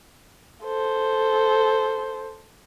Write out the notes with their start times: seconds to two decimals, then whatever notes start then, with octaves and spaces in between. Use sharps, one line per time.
0.64 A4 C5